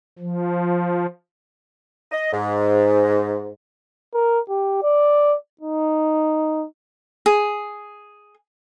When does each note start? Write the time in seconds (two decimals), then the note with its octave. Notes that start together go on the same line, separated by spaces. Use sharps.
0.19 F3
2.12 D#5
2.32 G#2
4.14 A#4
4.49 G4
4.82 D5
5.61 D#4
7.26 G#4